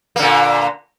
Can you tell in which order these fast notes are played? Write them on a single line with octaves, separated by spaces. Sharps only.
A#3 D3 A#2